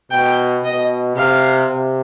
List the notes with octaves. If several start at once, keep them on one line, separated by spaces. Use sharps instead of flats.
B2 G5
B2 D#5
C3 F5
C3